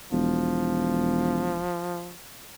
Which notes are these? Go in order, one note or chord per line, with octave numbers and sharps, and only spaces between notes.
E1 F3